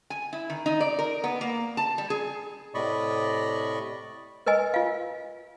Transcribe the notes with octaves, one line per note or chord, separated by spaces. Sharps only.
G#5
E4
D#3
D#4
D5
A#4
B3
A#3
A5
G3
G#4
A2 C3 D5 D#5 B5 C#6
A#4 B4 D#5 G#5
F4 F5